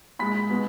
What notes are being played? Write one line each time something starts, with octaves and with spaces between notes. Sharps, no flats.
A#2 G#3 B5 B6
B2 G#3